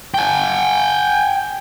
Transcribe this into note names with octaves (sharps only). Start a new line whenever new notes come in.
G5 G#5